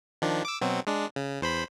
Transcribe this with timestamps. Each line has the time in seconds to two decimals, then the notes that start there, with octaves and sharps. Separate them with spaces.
0.22 D#3 F3 D4
0.45 D6 E6
0.62 B2 F#3 C4
0.87 G#3 D4
1.16 C#3
1.41 E2 C5 B5